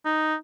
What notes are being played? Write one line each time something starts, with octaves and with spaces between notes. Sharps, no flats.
D#4